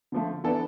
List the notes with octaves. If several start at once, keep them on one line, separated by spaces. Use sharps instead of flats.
D3 F3 A3
E3 B3 D4 A4